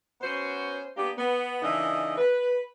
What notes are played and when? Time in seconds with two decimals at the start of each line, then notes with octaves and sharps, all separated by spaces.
0.21 B3 C#4 F#4 C5
0.97 A#3 B3 D4 G4
1.17 B3
1.62 C#3 E3 D4 D#4 A#4 D#5
2.17 B4